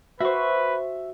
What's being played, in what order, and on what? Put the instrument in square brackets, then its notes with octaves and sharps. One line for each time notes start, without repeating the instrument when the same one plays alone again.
[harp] F#4 C5 [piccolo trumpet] B4 [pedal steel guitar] E5 C#6